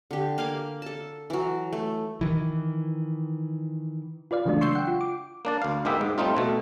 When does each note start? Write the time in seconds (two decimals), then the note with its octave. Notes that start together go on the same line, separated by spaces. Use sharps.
0.11 D3 G4
0.38 A#3 F5 G#5 D6
0.82 A4 A5
1.30 E3 F#3
1.73 A3
2.21 D#3 E3
4.31 F4 B4 D5 F5
4.46 C#3 E3 F#3 G#3 A3 D4
4.61 C6 C#6 E6 G6 C7
4.75 F#5 G5
4.87 F4
5.01 D6
5.45 A#3 D4 D5
5.62 D2 F5
5.85 G#2 G#3 A#3 B3 G4 E5
6.01 G#2
6.18 G3 A3 C4 D#4 F4
6.37 B2 A3